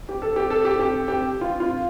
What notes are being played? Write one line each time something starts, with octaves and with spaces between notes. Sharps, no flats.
G4
A4
G4
A4
G4
G4
G4
F4
F4